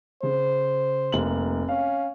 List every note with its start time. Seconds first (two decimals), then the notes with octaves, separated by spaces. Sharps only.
0.23 C#3 C5
1.12 F1 A#3 F#7
1.69 C#4 F5